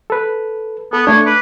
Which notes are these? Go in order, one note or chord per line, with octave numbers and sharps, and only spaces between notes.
A4 B4
B3 A4
A3 D4 C#5
B4 D6